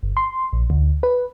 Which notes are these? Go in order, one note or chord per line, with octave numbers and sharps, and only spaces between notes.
G1
C6
A#1
D2
B4